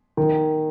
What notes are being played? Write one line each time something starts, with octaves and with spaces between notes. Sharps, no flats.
D#3